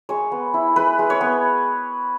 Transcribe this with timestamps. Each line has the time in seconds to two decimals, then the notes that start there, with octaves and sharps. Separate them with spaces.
0.09 G#3 C#5
0.31 B3
0.54 E4
0.76 G#3 B4
0.99 G#3
1.10 C#5
1.21 B3